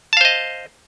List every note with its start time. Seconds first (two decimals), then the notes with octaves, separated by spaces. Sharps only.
0.13 A5
0.17 F5
0.21 C5
0.25 D#5